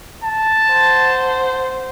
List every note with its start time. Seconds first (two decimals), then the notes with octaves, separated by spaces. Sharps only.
0.24 A5
0.71 C5 F#5